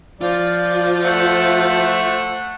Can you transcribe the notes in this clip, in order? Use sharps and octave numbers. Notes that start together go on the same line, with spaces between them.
F3 F4 D5
A3 C5 E5 F#5